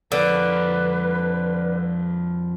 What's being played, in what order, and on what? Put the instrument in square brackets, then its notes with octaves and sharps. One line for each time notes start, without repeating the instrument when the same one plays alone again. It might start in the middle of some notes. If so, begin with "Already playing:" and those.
[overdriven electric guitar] F2 A#3 [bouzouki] D3 [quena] B4